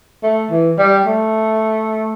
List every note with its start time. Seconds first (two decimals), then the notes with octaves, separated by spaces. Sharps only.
0.23 A3
0.51 E3
0.78 G3
1.06 A3